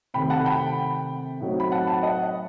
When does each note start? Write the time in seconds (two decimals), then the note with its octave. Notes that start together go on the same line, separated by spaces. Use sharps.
0.14 C3 D#3 A3 G5 B5
0.30 F#5 A5
0.46 G5 B5
1.40 A2 F#3 C4 D#4
1.60 B5
1.72 F#5 A5
1.88 F#5 A5
2.03 D#5 F#5